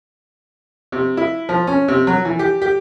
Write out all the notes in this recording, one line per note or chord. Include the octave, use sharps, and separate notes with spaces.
C3
E4
F3
C#4
C3
F#3
E3
G4
G4